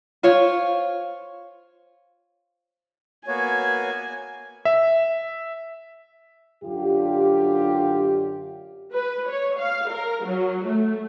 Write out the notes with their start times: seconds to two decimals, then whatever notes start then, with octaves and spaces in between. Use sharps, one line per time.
0.23 F4 C5 C#5 F5
3.28 A#3 B3 F#4 C#5 G#5
4.65 E5
6.64 F#2 D3 D4 F4 G4
8.95 B4
9.28 C#5
9.59 F5
9.92 A#4
10.26 F#3
10.64 A3